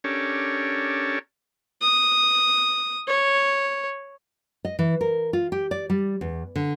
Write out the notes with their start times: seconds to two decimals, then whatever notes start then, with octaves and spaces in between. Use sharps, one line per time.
0.04 C#4 D4 G4 A4 A#4 C#5
1.82 D#6
3.07 C#5
4.65 D#5
4.79 E3
5.01 A#4
5.33 F4
5.52 G4
5.71 D5
5.90 G3
6.21 E2
6.56 D3